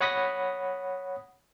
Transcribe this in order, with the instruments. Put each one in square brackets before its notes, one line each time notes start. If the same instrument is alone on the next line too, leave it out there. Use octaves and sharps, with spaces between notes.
[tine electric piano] C#5 F#5 B5 D#6 A#6 B6